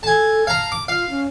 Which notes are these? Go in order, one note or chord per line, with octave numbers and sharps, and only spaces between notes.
A4 G#5 A5
F5 A5 A#5
D6
F4 F5
C#4